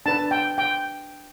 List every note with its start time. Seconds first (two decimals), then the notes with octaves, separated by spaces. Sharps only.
0.06 D4 B4 A5
0.31 G5
0.58 G5